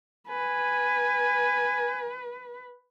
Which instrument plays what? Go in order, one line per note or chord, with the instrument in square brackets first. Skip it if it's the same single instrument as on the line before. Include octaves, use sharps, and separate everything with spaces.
[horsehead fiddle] B4 [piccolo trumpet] G#5